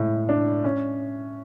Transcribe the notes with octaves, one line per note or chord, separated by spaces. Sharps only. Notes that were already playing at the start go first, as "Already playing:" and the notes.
Already playing: A2 G#3
D4
C#4